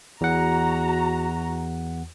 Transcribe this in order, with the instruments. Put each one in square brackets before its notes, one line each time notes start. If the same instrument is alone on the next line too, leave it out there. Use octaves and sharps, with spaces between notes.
[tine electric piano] E2 F#5 [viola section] F#4 A#5